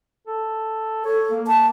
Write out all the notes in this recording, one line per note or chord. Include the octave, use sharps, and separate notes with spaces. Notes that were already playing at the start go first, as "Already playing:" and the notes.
A4
A4 C#5
A#3
A5